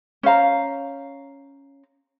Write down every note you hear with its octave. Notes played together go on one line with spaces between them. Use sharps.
C#4 C5 F5 A#5